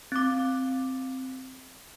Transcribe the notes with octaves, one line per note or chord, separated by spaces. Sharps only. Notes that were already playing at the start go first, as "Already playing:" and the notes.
C4 D6